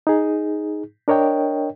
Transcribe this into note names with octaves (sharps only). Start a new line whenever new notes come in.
D#4 G#4
D4 A#4 C#5 D#5 G5